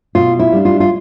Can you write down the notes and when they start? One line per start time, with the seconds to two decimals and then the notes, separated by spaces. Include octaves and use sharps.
0.15 B2 F4
0.39 E4
0.52 G3 D4
0.65 F4
0.80 F4